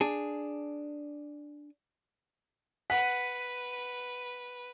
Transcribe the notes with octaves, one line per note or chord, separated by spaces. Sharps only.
D4 G#4
B4 F#5 B6